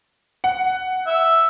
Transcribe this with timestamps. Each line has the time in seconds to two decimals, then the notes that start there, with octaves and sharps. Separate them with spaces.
0.44 F#5
1.07 E5